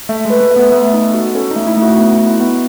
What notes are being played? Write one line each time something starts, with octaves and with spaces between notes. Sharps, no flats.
A3 E5
G#3
B4
A3
E5
B3
A3
D#4
F#4
C#4 A4
D#4
A3
E4
A3
F#4
B3
E4
B3